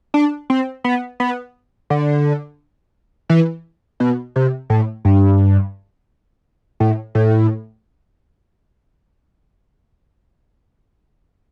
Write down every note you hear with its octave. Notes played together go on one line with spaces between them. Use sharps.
D4
C4
B3
B3
D3
E3
B2
C3
A2
G2
A2
A2